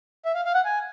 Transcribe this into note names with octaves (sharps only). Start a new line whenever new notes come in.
E5
F5
F5
F#5
G#5